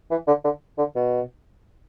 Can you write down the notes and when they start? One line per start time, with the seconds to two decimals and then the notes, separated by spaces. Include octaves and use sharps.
0.11 E3
0.27 D3
0.44 D3
0.78 D3
0.95 B2